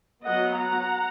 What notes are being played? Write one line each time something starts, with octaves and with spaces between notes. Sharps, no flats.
F#3 B3 D#5 F#5
F#5 A#5